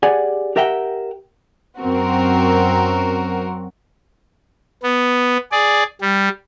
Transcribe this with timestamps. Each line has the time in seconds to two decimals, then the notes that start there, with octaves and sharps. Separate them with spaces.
0.03 G4 G#4 D5 F#5 G#5
0.56 G4 A#4 E5 F#5 G5
1.80 F#2 C4 F#4 A#4
4.83 B3
5.52 G#4 D5
6.01 G3